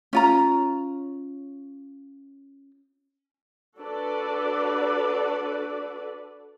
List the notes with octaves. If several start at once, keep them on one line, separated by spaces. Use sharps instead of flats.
C#4 F4 A#5
D4 F#4 A4 B4 D5